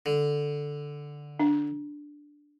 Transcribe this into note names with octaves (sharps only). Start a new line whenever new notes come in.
D3
D4